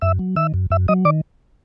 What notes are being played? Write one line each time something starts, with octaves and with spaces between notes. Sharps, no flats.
F#2 E5 E6
F#3
D#3 E5 E6
F#2
F#2 E5 E6
F#3 D#5 D#6
D#3 D5 D6